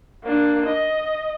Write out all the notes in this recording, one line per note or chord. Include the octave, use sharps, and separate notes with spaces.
A#3 D4
D#5